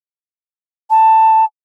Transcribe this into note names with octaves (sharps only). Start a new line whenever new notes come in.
A5